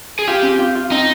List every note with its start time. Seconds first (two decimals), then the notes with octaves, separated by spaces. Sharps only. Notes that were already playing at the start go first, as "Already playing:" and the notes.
0.19 G#4
0.27 F4 G4
0.43 C4
0.59 F4
0.75 F4
0.91 C4 D#4